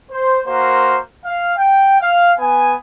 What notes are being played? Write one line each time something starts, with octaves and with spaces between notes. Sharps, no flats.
C5
A#3 F#4 A#4 C5 C6
F5
G5
F5
B3 G#5